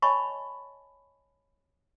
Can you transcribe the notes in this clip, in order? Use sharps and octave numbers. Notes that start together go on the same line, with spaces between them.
C#5 D#5 G#5 A5 B5 C#6